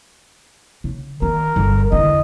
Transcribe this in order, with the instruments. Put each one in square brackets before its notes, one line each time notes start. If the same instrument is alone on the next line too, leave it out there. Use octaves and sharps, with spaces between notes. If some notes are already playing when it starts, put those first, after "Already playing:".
[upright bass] C#3
[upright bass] D#3 [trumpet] A#4
[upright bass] G1
[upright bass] E2 D3 [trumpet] D#5